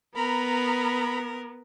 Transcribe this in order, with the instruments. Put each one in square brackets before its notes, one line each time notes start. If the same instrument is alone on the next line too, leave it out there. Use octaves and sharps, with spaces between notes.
[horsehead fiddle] B3 [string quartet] A#4 [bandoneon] A#5 B5